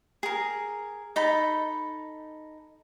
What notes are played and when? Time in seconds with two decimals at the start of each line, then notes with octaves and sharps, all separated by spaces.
0.23 G#4 A#4
1.16 D#4 A4 B5